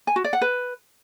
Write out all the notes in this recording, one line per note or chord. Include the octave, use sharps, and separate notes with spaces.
G#5
F#4
D5
F#5
B4